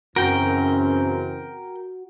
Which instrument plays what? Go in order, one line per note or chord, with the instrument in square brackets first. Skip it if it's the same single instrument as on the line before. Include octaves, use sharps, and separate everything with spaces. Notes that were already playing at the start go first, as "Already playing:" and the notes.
[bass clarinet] F#2 [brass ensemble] C#3 E3 C4 [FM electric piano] F#4 [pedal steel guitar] A#4 G5